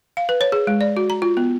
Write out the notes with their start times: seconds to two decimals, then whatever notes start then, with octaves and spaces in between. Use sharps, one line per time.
0.17 F5
0.29 B4
0.41 C#5
0.52 G#4
0.67 G#3
0.81 D5
0.97 F#4
1.10 A#5
1.22 F4
1.37 B3